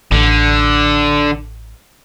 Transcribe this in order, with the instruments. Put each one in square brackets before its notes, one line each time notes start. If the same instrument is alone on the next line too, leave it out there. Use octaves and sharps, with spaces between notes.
[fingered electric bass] A1 [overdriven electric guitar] D3